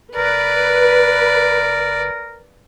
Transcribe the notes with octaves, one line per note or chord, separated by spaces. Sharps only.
F#1 A#4 B4 D5